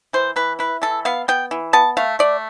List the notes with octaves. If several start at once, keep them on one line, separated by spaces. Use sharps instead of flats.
E3 C5
E3 B4
E4 B4
E3 A4
B3 F5
B3 G5
E3
B3 A5
A3 F5
A3 D5